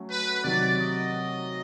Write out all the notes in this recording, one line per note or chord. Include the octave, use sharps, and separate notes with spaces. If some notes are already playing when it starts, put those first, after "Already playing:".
Already playing: F#3 A3 C#4
B4
C3 D#3 F#3 D5
D#5